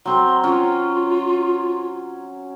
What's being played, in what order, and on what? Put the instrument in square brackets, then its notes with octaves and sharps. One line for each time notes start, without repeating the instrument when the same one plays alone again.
[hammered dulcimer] F#3 C4 A#5 [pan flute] C6
[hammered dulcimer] C#4 [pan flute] F4